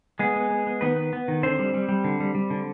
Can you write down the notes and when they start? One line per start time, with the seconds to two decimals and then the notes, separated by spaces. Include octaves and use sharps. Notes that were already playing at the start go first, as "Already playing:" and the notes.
0.19 G#3 B3 G#4
0.36 B3
0.50 B3
0.67 B3
0.81 D#3 B3 B4
0.96 B3
1.13 B3
1.28 D#3
1.43 D3 C4 C5
1.59 G3
1.74 G3
1.89 G3
2.04 D3
2.20 G3
2.35 G3
2.50 D3